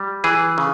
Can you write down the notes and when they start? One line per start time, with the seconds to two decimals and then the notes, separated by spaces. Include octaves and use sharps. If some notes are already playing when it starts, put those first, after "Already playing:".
Already playing: G3
0.24 E3 G#4
0.58 C#3